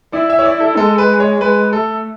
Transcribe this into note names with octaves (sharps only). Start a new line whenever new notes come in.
E4 D5
E5
C#5
D5
A4
G#3 A4
B4
C#5
G#3 B4
A3 A4